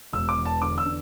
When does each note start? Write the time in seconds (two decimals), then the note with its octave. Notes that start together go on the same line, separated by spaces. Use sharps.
0.13 E1 E6
0.29 D6
0.37 E2
0.45 A5
0.61 D3 D6
0.78 E6
0.86 D4